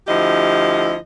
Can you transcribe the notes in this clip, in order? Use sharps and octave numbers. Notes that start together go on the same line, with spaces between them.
D2 F3 E4 G4 D#5